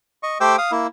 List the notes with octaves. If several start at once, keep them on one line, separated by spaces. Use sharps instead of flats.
D#5 C#6
A3 G4 C5 G5 D6 E6
F5 D#6
A#3 E4